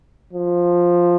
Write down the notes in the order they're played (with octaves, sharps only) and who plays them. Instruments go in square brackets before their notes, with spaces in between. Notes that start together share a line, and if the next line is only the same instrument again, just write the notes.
[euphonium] F3